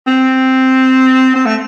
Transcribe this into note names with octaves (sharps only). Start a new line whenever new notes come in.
C4
C4
A3